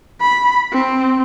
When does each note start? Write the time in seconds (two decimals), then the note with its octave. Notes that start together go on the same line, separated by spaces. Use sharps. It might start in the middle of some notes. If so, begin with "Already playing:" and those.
0.21 B5
0.72 C4